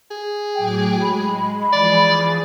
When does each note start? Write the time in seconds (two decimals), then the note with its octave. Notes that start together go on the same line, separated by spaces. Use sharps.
0.11 G#4
0.55 A2 F#3 G5 D6
1.02 G#3 B5
1.72 E3 F3 G#4 D5